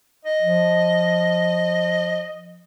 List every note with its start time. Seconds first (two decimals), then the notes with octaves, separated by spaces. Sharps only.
0.25 D#5
0.42 F3